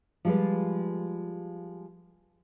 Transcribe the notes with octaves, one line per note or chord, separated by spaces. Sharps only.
F3 G3 G#3 F4 B4